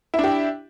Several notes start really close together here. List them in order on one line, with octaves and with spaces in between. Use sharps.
E4 D4 G4